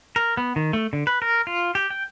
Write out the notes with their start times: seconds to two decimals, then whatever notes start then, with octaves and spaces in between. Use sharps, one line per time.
0.16 A#4
0.37 B3
0.56 D#3
0.73 A3
0.93 D3
1.07 B4
1.22 A#4
1.47 F4
1.75 G4
1.90 G5